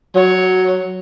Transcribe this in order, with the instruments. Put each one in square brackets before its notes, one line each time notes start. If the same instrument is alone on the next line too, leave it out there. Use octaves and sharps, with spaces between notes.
[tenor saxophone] F#3 [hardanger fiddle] C#5